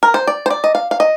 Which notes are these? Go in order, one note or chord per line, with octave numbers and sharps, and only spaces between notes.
A#4
C5
D5
C5
D5
D#5
F5
F5
D#5